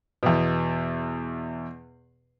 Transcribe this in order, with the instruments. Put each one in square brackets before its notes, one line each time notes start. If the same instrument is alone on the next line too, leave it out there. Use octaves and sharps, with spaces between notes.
[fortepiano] E2 B2